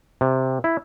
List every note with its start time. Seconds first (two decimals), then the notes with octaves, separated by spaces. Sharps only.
0.21 C3
0.64 E4